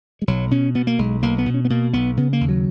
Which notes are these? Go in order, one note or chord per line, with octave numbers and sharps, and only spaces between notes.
G#3
B1 F#3
B2 C#4
B2 B3
A#3
B1 G#3
B1 A#3
B3
B2
C#4
B3
B2 A#3
B1 B3
C#3 B3
A#3
D#2
F#3